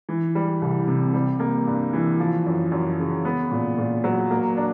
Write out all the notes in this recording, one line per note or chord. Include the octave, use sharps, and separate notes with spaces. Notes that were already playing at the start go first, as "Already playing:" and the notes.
E3
G3
C2
C3
G3
A#3
G2
E3
F3
F#2
F#2
C#3
B3
A#2
A#2
F#3
A#3
D4